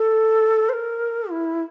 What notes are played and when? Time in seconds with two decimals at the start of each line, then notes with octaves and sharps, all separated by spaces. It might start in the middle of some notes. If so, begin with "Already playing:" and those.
Already playing: A4
0.69 C5
0.73 A#4
1.30 E4